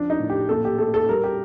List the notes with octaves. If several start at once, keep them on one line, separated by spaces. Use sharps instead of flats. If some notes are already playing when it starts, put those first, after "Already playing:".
Already playing: F3 D4
D#4
A2
G4
A#2 A4
G4
A3 A4
A4
G3 A#4
G4